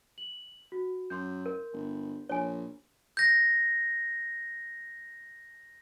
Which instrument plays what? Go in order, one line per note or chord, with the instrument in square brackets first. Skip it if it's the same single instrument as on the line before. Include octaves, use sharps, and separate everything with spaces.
[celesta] F#7
F#4
[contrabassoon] F#2 [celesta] C6 G6
[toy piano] A#4
[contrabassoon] G1
[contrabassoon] A#1 [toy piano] C#5 G#5
[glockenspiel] G6 A#6